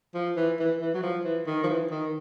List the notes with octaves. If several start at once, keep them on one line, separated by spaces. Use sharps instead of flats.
F3
E3
E3
E3
F#3
F3
E3
D#3
F3
E3
D#3